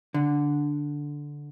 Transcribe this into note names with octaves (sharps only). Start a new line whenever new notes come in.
D3